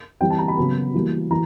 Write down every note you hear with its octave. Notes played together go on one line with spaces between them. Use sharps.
E3 G3 C4 G5
A5
A#5
B5
C#3 F#3 B3
E3 G3 A#3
E3 A#5